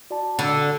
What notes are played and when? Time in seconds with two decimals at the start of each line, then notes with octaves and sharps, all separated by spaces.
0.10 F#4 D5 A5
0.39 D3